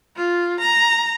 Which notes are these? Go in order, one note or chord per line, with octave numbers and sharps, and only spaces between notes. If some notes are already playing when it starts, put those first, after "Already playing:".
F4
A#5